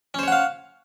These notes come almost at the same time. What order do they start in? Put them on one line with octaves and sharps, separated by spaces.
C#4 C5 C#5 F#5 F5